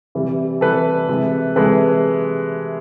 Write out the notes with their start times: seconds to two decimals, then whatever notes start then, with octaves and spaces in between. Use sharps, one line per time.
0.15 C3 E3 G3
0.61 C3 E3 G3 A4 B4
1.09 C3 E3 G#3
1.56 C3 E3 G#3 A4 B4